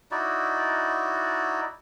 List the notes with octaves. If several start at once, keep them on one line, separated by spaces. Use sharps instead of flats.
D#4 E4 F#4 D5